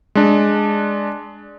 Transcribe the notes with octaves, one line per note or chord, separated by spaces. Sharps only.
G#3 D4